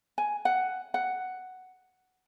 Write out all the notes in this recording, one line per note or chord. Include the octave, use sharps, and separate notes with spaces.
G#5
F#5
F#5